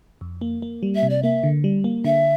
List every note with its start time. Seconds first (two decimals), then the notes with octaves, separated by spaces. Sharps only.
0.21 F2
0.41 A#3
0.62 A#3
0.83 G3
0.95 E5
1.03 C3
1.10 D5
1.23 A#3 E5
1.44 D3
1.64 G3
1.84 A#3
2.04 D3 E5